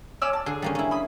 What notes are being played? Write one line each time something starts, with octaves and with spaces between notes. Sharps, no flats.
C#4 D5 E6
A5
D3 G#4
G3 A#3 C#4
C#4 E4
B5 D#6